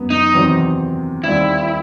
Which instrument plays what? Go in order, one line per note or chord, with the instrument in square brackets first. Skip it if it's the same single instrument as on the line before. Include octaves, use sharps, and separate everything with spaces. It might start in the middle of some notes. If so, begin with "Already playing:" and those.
Already playing: [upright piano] F#2 B3
[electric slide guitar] D#4
[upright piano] E2 C3 D#3 F#3 C4
[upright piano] D#2 D#3 G3 C4 [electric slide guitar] E4